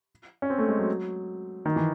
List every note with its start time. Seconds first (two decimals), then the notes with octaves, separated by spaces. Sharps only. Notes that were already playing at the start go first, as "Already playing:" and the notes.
0.42 C#4
0.50 C4
0.59 A3
0.68 G#3
0.79 F#3
1.65 D#3
1.76 E3